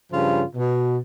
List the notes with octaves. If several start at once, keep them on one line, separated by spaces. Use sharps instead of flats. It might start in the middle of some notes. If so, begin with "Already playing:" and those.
G2 C#3 F3 F4
B2